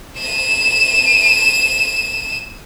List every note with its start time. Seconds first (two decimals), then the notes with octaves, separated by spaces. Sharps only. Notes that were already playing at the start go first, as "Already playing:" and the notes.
0.19 D#7 E7